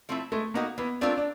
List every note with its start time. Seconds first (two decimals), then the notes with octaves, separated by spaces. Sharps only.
0.09 F3 A3 C4 E4
0.32 G#3 A3
0.54 A#3 B3 D#4 F#4
0.78 E3 B3
1.01 A3 C4 D4 F4 A#4
1.18 D4